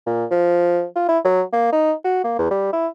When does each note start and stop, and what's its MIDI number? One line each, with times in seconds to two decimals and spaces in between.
0.06 0.25 46
0.30 0.85 53
0.96 1.07 65
1.09 1.19 64
1.25 1.42 54
1.53 1.67 58
1.72 1.93 63
2.04 2.21 66
2.24 2.38 58
2.39 2.50 40
2.51 2.72 55
2.73 2.88 64